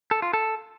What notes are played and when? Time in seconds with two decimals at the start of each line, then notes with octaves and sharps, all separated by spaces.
0.11 A4
0.22 F4
0.34 A4